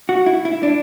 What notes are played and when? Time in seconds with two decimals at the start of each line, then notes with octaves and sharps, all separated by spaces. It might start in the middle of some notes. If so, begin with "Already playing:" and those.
0.09 F#4
0.26 E4
0.45 E4
0.63 D4